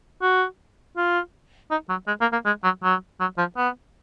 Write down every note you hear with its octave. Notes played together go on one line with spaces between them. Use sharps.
F#4
F4
D#4
F#3
G#3
A#3
A#3
G#3
F#3
F#3
F#3
F3
B3